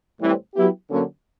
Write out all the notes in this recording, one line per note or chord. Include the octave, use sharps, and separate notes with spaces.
A2 E3 G3 C4
F#3 B3 E4 G4
D3 F#3 A#3 C#4